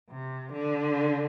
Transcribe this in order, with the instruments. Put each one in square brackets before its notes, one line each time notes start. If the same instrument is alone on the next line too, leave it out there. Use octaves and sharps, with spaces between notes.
[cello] C3
D3